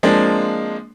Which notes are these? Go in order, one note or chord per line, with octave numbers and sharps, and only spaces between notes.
F3 G#3 A#3 C4 D4